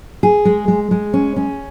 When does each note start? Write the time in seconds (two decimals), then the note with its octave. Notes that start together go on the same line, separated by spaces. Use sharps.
0.23 G#4
0.45 G#3
0.68 G#3
0.91 G#3
1.14 C#4
1.36 C#4